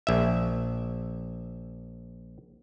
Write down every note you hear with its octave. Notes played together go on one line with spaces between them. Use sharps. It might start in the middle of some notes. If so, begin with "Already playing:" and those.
A#1 E5